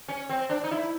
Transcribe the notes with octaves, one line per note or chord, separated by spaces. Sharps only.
C#4
C4
D4
D#4
E4